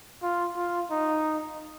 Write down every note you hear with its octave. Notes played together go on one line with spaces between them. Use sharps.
F4
F4
D#4